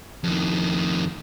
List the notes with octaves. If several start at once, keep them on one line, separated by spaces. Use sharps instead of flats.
F2 D#3